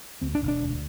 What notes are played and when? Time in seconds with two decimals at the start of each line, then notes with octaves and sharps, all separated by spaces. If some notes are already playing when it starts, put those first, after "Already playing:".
0.21 D2 C4
0.35 D4
0.42 E1
0.48 D4
0.61 D2